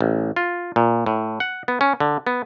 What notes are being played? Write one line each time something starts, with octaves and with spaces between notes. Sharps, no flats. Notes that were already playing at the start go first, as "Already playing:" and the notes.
A1
F4
A#2
A2
F#5
B3
C#4
D3
B3